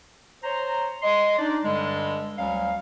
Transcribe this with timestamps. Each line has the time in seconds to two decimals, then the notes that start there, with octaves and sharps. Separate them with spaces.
0.44 C5 C#5 A#5
1.02 D#5 C6
1.37 D4 D#4 D5
1.63 G2 D3 G3 G#3
2.37 D2 F#3 G3 C#4 F5